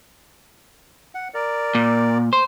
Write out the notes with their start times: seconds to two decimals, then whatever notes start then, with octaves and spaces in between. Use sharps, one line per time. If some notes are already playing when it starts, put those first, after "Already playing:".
1.15 F#5
1.34 A#4 D5
1.75 A#2
2.33 C5